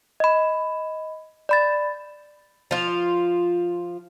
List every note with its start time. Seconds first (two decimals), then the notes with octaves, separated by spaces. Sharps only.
0.20 D#5 B5
1.49 D5 B5 A6
2.71 F3 F4